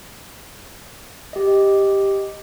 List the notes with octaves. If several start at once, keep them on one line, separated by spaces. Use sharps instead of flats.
G4 D#5